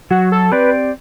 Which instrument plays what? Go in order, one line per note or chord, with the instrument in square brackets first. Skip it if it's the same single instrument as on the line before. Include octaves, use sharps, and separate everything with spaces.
[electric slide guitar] F#3 [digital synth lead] F#4
[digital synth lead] A4
[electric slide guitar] C4 G4 D5 [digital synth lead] B4